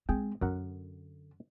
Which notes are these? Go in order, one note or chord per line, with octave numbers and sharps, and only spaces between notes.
G#3 C4 G#4 G5
F#2 D3 A#4 F#5